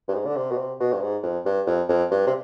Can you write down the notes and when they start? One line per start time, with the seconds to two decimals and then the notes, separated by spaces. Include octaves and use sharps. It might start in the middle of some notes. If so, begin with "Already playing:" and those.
0.08 G2
0.14 G#2
0.26 D3
0.36 C3
0.51 B2
0.57 C3
0.80 B2
0.93 G2
1.01 G#2
1.23 F2
1.45 G2
1.67 F2
1.88 F2
2.11 G2
2.26 C3